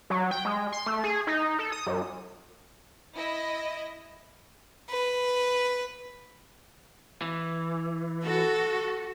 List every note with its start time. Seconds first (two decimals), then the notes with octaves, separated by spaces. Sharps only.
0.10 F#3
0.31 G5
0.45 G#3
0.72 C6
0.87 A3
1.04 G#4
1.27 D#4
1.59 A4
1.72 D#6
1.86 F#2
3.16 E4 D#5
4.89 B4
7.21 E3
8.24 F#4 A4